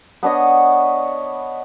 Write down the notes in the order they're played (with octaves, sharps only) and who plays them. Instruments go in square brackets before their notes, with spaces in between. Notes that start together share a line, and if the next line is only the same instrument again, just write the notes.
[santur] B3 D4 C#5 D#5